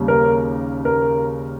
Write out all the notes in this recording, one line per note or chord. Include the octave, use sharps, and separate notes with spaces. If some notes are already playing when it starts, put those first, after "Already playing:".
Already playing: D#2 C#3 G3
A#4
A#4